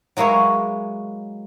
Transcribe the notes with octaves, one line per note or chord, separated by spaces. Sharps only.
F#3 G#3 A#3 E4 C#5